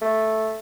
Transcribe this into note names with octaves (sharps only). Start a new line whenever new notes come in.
A3